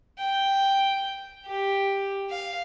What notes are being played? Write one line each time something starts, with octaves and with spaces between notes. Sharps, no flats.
G5
G4
F5